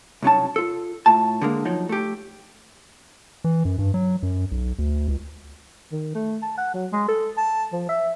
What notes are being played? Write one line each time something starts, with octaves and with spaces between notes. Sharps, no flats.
C2 F#2 F#3 C#4 D#4 A5
F4 A4
A2 A3 F4 A5
D3 G#3 A#3
F3 F#3 D#4
A3 G4
E3
F#2
G2
F#3
F#2
B1
D2
C#2
D#3
A3
A5
F#5
F#3
G#3
A4
A5
F3
E5